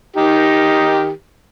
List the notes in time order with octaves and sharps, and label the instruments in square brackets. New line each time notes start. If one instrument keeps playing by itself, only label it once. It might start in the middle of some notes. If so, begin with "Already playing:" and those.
[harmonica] D#3 D#4 G4